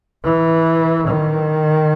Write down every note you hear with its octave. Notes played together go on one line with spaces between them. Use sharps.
E3
D#3